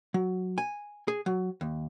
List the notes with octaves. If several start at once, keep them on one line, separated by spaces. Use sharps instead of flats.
F#3
G#5
G#4
F#3
D#2